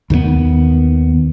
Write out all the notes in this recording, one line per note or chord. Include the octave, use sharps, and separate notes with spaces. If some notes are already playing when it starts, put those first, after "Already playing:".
D#2 D#3 G#3 B3